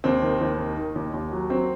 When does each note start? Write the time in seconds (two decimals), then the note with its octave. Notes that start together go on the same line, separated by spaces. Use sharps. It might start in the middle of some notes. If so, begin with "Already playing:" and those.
0.04 D#2 C4
0.23 D#3
0.41 D#2
0.59 D#3
0.77 D#3
0.96 D#2
1.13 D#2
1.32 F#3
1.50 F#3 C4